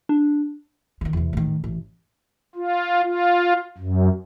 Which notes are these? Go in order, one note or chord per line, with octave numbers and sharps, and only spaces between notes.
D4
D3 D#3
E2 C3
A2 D#3
A1
F4
F4
F#2